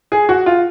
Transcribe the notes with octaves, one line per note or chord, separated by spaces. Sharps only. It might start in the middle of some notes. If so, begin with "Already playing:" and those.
G#4
F#4
F4